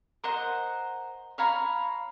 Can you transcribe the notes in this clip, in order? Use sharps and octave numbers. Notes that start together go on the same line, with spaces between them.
A#4 C5 D#5 F#5
C#5 F5 A#5 B5